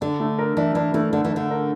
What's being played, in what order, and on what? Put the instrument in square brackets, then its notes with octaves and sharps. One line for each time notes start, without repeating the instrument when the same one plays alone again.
[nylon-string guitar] D3 [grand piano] D4
[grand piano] A3
A#4
[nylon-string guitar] E3 [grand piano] D4
[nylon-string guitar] E3 [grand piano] D4
[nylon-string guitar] E3 [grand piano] A3
[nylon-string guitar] D3 [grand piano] D4
[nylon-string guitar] E3
[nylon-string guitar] D3 [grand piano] D4
[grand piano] A#4